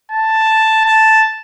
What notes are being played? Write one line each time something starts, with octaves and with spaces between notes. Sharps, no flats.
A5
A5